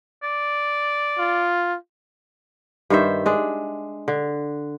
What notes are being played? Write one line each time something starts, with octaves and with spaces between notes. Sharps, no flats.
D5
F4
G2 D#3 C5 E5
G#3 D4
D3